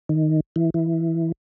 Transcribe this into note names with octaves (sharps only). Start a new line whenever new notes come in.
D#3
E3
E3